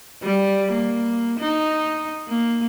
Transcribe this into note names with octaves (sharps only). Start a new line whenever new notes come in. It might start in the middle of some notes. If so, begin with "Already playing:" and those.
G3
A#3
D#4
A#3